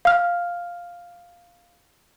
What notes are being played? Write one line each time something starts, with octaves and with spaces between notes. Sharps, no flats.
F5 F6